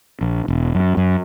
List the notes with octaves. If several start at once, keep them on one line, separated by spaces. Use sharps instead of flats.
A#1
E1
F#2
F#2